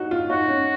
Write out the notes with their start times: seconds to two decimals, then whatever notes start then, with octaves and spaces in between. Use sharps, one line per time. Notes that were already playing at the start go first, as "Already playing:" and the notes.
Already playing: D#4 F#4
0.11 F4
0.29 D#4 F#4
0.48 C#4